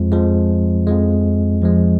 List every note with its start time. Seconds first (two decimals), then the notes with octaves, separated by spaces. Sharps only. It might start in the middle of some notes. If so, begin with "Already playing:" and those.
Already playing: F2 F3 G#3
0.12 F2 F3 G#3
0.87 F2 F3 G#3
1.62 F2 F3 G#3